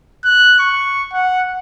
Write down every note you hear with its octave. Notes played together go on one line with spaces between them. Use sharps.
F#6
C#6
F#5